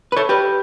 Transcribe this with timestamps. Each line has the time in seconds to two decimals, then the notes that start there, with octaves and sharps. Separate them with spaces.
0.12 B4
0.17 A4 C#5
0.29 G4 B4